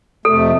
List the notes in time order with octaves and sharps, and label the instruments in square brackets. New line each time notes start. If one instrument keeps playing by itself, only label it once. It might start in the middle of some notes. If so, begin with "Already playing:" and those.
[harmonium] F2 C3 A3 [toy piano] A4